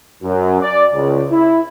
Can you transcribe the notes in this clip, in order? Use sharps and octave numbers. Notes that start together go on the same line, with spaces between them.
F#2
D5
C#2
E4